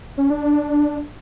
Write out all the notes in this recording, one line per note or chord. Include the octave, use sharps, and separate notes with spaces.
C#4
D4